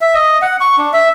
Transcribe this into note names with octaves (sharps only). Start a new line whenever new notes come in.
E5
D#5
F#5
C#6
D4
E5